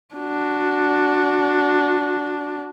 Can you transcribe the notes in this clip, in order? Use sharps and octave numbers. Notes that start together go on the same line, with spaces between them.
D4 F#4